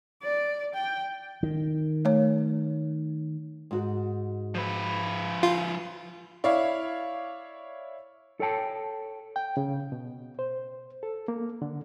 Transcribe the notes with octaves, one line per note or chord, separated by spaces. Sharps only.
D5
G5
D#3
A3 C#5
G#2 F#4
F3 B4
F4
E4 C#5 D5 F5
A4 C#5 G5 A5
G5
C#3
B2
C5
A4
A#3
D3